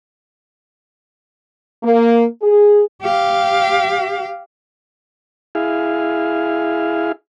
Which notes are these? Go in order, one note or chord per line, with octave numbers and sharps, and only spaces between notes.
A#3
G#4
G4 F5
E4 G#4 F5